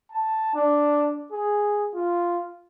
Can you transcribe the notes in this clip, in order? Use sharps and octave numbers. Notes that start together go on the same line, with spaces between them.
A5
D4
G#4
F4